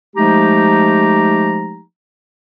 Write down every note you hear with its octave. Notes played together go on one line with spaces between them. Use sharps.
F3 G#3 A3 D#4 G4 A#5